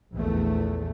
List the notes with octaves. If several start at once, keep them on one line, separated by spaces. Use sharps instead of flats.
A#1 E2 A3